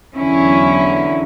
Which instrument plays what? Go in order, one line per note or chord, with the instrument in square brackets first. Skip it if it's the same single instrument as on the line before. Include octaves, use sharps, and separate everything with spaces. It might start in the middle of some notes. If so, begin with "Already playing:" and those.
[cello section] E2 D3 F#3 C#4 E4